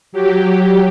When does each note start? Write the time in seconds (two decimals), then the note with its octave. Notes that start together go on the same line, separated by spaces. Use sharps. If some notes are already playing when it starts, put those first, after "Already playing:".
0.12 F#3 G4